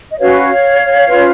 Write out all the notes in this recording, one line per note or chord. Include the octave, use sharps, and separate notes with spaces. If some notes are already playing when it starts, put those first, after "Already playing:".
D#5
C#4 F#4 B4 C#5 F5
C#4 F4 B4